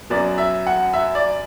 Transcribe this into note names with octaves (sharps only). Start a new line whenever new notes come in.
F#2 F#3 B3 D5
E5
F#5
E5
D5